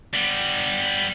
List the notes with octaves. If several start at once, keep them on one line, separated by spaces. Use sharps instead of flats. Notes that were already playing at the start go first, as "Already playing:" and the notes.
G3 B3